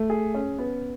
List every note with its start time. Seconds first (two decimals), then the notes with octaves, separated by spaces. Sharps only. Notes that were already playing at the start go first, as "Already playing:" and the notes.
Already playing: A3
0.10 G#4
0.35 C#4
0.58 B3